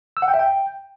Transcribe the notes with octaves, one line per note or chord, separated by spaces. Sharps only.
E6
F#5
G5
E5
G5